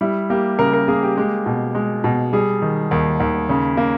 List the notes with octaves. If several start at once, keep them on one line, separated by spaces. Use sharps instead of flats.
G3 E4
A#3 G4
C#3 A#4
A#4
A#3 G#4
G4
G#3
B2
G#3
B2
G3 G#4
D#3
D#2
D#2
C#3
A#3